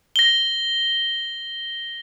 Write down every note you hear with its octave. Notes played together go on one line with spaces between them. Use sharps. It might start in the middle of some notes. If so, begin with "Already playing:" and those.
A#6 G7